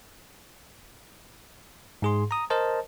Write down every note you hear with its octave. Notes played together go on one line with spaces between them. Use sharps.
G#2 G#4 C6
A#5 D#6
A#4 C5 D#5 A5